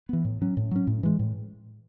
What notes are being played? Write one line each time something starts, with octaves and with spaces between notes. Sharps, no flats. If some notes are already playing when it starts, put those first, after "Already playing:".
E3 B3
A2
F#3 C#4
A2
F#3 C#4
A2
E3 G#3
A2